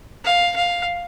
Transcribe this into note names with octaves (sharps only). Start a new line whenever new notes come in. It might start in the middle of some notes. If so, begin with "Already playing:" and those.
F5
F5